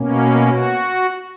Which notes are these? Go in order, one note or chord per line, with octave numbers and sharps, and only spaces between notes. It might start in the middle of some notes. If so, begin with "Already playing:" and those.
Already playing: B2 A#3 C#4
A#4
F#4